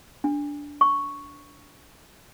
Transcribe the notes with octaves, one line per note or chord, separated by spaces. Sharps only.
D4
C#6